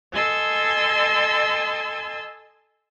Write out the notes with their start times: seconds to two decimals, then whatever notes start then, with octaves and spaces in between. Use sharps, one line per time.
0.12 A4 D#5 G#5 C6 E6